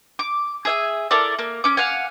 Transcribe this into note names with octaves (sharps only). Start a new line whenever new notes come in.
D6
G#4 E5 G#5
E4 A4 A#4 D5
A#3
C#4 D6
F5 F#5 G#5